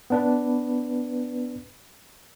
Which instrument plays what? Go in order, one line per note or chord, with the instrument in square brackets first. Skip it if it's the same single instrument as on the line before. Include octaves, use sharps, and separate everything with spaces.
[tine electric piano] B3 D4 B4